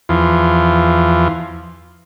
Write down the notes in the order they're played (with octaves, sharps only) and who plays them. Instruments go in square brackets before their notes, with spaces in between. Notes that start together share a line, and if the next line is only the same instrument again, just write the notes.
[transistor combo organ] E2 F3